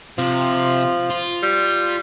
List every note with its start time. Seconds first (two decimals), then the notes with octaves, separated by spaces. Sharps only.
0.18 C3 F3
1.10 F4
1.43 G3